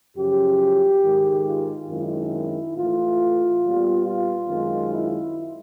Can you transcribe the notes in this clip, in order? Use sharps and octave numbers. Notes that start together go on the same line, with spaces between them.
F#2 C#3 F3 G4
G#2 D#3 G#3
F4
F#2 D#3 G#3 C4 E4
A2 E3 A3 F4
A#2 G3 B3
F4
F#2 D#3 G#3 C4
E4